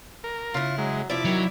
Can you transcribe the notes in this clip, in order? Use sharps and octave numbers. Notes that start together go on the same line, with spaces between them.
A#4
C#3 E4 F4
F#3 G#3
C3 F3 E4 D5
D#3 F#3